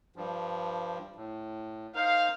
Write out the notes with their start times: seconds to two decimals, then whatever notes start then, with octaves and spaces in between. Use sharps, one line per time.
0.16 G2 F3
1.16 A2
1.95 D#4 A#4 C5 F5